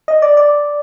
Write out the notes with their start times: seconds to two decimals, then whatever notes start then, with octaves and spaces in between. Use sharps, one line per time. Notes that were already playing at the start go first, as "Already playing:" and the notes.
0.08 D#5
0.22 D5
0.37 D5